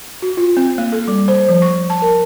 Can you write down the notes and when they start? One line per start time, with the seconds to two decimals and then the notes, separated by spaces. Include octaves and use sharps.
0.22 F#4
0.37 F4
0.57 C4
0.78 A#3
0.92 A4
1.08 G3
1.28 C5
1.49 F3
1.62 C#6
1.90 A5
2.02 A#4